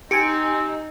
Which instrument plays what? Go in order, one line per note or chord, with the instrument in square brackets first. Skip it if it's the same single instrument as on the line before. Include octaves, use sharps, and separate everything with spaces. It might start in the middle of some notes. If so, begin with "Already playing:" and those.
[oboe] C4 [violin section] D#4 [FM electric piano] G4 G#5 [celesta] C#7 D7